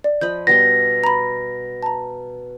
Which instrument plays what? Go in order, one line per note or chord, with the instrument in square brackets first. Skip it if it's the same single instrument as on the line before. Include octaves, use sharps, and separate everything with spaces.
[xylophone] D5
[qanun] F3 D#5 B5 [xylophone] G6
[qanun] B2 G3 G5 [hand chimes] A#6
[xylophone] A#5 B5
A5 A#5